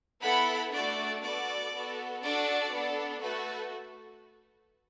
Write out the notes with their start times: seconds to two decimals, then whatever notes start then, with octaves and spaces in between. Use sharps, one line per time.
0.22 B3 E4 A4 F#5 B5
0.72 A3 D4 F#4 A4 D5
1.23 B3 F#4 A4 D5
1.72 B3 F#4 A4
2.22 D4 F#4 A4 D5
2.72 B3 D4 A4
3.21 A3 F#4 A4 B4